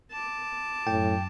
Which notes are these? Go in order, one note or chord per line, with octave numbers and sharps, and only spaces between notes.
A5 D6
F#2 A2 G5